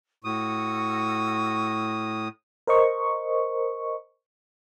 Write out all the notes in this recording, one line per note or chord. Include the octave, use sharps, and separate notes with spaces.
A2 F#4 C#6 D#6 E6
A#4 C5 D#5 C#6